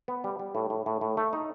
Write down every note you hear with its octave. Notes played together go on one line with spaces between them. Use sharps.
B3
G3
G3
A2
A2
A2
A2
A3
D#4